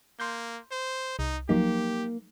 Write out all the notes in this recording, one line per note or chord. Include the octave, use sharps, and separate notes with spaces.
A#3 C6 G6
C5
C2 D#4
F3 F#3 A#3 D#4 G4